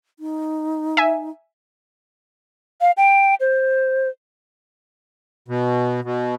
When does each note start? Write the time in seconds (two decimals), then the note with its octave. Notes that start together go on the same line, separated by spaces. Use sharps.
0.19 D#4
0.97 E5 G#5
2.81 F5
2.97 G5
3.40 C5
5.48 B2
6.04 B2